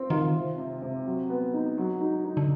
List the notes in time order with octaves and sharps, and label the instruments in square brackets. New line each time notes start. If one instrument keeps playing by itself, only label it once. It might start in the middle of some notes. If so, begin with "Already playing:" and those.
Already playing: [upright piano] C4 F4
[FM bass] D#3 [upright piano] F4
[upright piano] C3
C3
C3
F#3
B3
D#4
F#3
D#4
D#4
[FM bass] D3